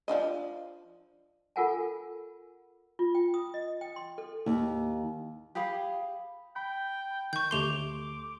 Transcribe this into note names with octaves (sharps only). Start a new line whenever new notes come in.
F3 D4 D#5
F4 A4 A#4 F#5 G#5 A5
F4
G5
D#6
D#5
G5
C6
A4
D#2
G4 G#4 F5 B5
G5 B5
D#3 C#6 G6
D2 A3 G4 C6 D6 F7 G7